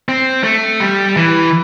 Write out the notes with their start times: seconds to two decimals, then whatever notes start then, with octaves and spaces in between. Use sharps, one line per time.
0.09 C4
0.44 A3
0.80 G3
1.17 E3